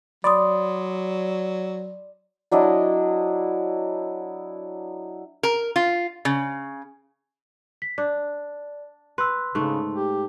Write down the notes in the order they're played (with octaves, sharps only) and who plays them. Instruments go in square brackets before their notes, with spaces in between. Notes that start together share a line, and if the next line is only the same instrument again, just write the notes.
[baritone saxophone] F#3 [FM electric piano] D5 [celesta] B5 C6 D#6
[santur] F#3 D4 E4 D#5
[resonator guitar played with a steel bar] A#4
F4
C#3
[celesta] B6
[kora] D4 [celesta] D5
[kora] B4 [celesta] C6 E6
[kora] G#2 A3 [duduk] C#3
[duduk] G4